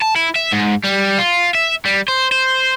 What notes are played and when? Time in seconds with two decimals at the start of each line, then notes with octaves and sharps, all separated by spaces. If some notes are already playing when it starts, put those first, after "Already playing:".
0.02 A5
0.16 E4
0.36 E5
0.52 G#2
0.84 G3
1.18 F4
1.55 E5
1.85 G3
2.08 C5
2.32 C5